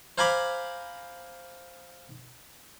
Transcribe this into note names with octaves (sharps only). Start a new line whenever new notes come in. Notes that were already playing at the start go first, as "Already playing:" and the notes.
C5 F5 G#5 A#5 B5 D6